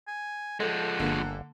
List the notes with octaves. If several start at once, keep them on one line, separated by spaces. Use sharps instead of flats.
G#5
F3 G#3 A4 F#5
G1 D3 A#3